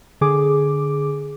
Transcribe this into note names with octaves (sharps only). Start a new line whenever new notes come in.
D3 G#4 D6